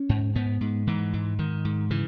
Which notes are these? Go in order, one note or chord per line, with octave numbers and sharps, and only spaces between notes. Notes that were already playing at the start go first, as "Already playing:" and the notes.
Already playing: C#4
G#2
G#2 B3
G#2
G#2 E3
G#2
G#2 D#3
G#2
C#3 E3